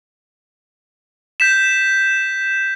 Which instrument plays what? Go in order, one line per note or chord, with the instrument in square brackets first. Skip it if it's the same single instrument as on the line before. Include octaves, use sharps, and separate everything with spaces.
[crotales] G6 B6 E7